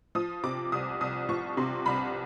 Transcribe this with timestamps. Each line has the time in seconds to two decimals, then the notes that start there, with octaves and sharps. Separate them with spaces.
0.15 F3 D#6
0.44 C3 D6
0.72 C2 D#6
1.01 C2 D#6
1.29 F3 C#6
1.57 C3 C6
1.86 C2 B5